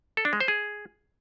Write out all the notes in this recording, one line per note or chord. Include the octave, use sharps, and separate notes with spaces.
A4
D4
G#3
C5
G#4